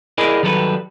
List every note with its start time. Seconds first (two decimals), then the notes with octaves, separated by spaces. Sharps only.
0.18 E4 G#4 A#4 D5 D#5 G#5
0.43 D#3 F#3 G3 A4 B4